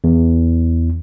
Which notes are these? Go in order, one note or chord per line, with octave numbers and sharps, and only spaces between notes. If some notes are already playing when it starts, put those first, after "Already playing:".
E2